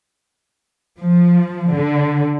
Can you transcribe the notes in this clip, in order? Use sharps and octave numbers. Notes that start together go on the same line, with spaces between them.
F3
D3